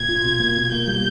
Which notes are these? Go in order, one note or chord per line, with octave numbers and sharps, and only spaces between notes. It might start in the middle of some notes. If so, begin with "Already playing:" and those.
Already playing: A#2 G#6
F4
B2
A#3
B2
A#3 G6
G3